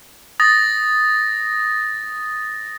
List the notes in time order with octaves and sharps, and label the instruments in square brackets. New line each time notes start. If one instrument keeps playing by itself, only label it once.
[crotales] D#6 A6 A#6